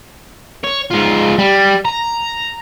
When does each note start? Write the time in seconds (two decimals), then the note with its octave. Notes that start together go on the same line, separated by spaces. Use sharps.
0.64 C#5
0.91 G#2 F4
1.39 G3
1.85 A#5